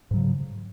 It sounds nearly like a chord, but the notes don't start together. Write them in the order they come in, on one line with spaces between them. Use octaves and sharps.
G#2 F#3 C#3